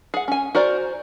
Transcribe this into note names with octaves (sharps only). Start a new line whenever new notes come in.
G#4 F#5
C#4 G#5
F#4 A#4 C5 D5